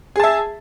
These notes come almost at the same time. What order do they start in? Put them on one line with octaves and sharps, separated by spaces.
G#4 A5 E5